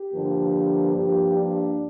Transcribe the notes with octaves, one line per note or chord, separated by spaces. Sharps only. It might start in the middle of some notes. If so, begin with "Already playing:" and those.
Already playing: G4
G2 D3 F3 A#3
G2 F3 A#3 G4
D4